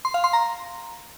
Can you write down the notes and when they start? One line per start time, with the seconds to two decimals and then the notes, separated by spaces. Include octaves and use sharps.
0.05 C6
0.14 F5
0.24 C6
0.33 A#5